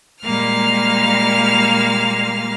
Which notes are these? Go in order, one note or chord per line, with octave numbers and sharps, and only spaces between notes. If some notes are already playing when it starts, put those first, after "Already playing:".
A#2 G3 G#3 A#3 F5 F6